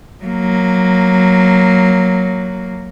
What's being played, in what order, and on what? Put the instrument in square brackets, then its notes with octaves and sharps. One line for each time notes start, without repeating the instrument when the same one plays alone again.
[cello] F#3 A#3